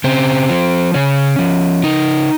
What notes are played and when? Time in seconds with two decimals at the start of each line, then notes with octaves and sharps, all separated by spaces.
0.04 C#3 C4
0.49 F3
0.94 C#3 C#4
1.39 F3
1.84 C#3 D#4